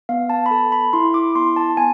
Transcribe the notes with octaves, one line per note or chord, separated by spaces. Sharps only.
B3 F5
A5
B5
A4 A5
B5
E4 C6
D6
B3 C6
A5
B3 G#5